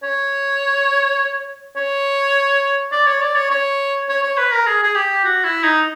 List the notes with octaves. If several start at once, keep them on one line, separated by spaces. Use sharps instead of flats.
C#5
C#5
D5
C#5
D5
C#5
C#5
C#5
C#5
B4
A#4
G#4
G#4
G4
F#4
E4
D#4